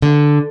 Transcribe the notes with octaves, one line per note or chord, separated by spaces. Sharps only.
D3